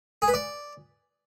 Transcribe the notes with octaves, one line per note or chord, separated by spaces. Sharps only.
G#4
B4
D5